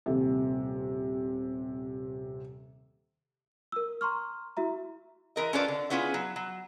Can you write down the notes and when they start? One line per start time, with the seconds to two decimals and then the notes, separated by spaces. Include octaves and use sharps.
0.06 D#1 C3
3.72 A#4 E6
4.01 A#5 C6 C#6 F6
4.57 E4 F#4 E5 A#5
5.36 E3 A#4 D#5
5.53 C#4 D4 F4 A4 B4 D5
5.68 D3
5.90 B3 C#4 E4 F4 G#4
6.14 F#3
6.36 F#3